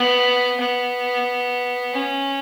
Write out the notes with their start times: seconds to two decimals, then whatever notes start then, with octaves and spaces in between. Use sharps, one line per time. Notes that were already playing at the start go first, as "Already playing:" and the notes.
Already playing: B3
0.60 B3
1.93 C#4